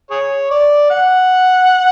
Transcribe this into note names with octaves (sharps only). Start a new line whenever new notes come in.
G#4 C#5
D5
F#5